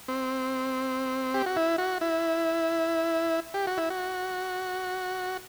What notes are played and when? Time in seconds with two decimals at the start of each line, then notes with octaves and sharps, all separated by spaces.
0.08 C4
1.34 G4
1.46 F#4
1.56 E4
1.78 F#4
2.01 E4
3.54 G4
3.67 F#4
3.78 E4
3.90 F#4